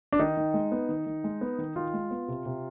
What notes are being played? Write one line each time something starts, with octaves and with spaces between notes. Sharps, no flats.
D4
D#3 D#4
D#3
G#3
B3
D#3
D#3
G#3
B3
D#3
D#3 F4
G#3
B3
C3
C3